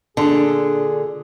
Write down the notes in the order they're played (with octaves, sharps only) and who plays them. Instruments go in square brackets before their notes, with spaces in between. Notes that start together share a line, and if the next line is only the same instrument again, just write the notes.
[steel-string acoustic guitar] A#2 D3 [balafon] D4 A5 [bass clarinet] G#4